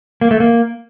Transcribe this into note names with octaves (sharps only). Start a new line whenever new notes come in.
A#3
A3
A#3